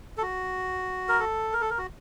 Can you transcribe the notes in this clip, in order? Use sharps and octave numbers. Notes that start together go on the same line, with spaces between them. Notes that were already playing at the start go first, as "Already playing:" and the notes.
A4
F#4
A#4
A4
A#4
A4
A#4
F#4